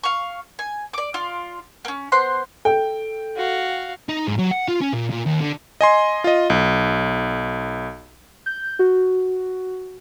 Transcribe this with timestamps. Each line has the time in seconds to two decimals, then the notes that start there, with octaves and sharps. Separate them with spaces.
0.03 F5 C#6
0.59 G#5
0.93 D5 D6
1.14 F4 D5 C6
1.85 A#3 C#4
2.12 B3 C5 C6 F#6
2.65 A4 G5
3.36 F#4 F5
4.09 D#4
4.27 G#2
4.39 F#3
4.51 F#5
4.68 F4
4.81 C#4
4.93 A#2
5.11 A#2
5.26 D#2
5.40 D3
5.81 D#5 G#5 C6
6.24 F4 D#5
6.50 B1
8.46 G6
8.79 F#4